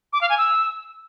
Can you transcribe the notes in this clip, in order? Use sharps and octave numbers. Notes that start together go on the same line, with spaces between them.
D6
F5
G#5
E6